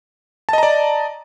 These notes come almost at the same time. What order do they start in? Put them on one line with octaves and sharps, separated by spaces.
A5 D#5 A#5 D5